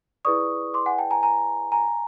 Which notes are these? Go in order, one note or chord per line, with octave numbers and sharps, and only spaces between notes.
E4 G#4 B4 D5 C#6 D#6
C6 D6
F#5 G#5
G5 A5
G#5 A#5
G#5 A#5
G#5 A#5